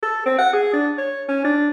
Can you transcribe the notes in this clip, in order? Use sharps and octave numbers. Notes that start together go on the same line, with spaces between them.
A4
C4
F#5
G#4
D4
C#5
C#4
D4